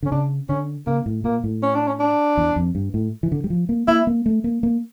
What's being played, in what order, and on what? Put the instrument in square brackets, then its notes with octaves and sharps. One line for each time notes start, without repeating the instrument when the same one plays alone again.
[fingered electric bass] D3 [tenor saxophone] C#4
[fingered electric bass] C#3 [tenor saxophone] D4
[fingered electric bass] D3 [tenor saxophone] C#4
[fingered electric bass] C#3 [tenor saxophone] A#3
[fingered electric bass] A2
[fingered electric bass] A#2 [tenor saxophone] A#3
[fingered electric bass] A2
[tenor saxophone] C#4
D4
C#4
D4
[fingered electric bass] E2
F2
G2
A2
E3
D3
G3
F3
A#3
[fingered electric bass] A#3 [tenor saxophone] E4
[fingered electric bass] A#3
A3
A#3
A#3